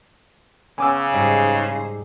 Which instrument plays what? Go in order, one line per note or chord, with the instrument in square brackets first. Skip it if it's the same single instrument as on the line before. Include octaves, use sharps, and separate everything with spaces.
[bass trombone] C#3 [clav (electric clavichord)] B3 C#4 [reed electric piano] G#5 D6 E6
[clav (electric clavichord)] G#2 G3 [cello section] D#4 G#4 C5